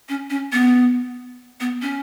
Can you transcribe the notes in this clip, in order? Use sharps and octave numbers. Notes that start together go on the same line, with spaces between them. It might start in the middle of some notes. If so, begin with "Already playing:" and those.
C#4
C#4
B3
B3
C#4